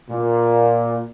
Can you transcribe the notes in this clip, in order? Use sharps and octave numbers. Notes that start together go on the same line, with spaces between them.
A#2